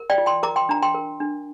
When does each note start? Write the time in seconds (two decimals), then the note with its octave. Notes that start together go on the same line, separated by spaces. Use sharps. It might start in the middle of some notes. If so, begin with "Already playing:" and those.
Already playing: A#4
0.10 D5 G5
0.18 F4
0.26 G5 C6
0.43 A#4 A#5 D6
0.56 G5 C6
0.69 D4 A#5
0.82 G5 C6
0.94 A#4
1.20 D4